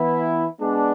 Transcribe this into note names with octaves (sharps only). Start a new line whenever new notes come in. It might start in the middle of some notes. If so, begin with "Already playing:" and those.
Already playing: E3 B3 E4
G#3 B3 D4